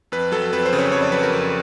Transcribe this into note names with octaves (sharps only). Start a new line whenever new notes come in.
F2 B4
F#3 A4
F2 B4
C5
C#3
C#5
F2 C#5
D5
F#3 B4
A#4
F2